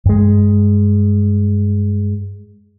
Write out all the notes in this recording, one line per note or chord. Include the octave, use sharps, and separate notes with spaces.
G2 G#3